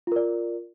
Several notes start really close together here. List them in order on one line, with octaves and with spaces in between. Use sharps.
F4 A#4 D5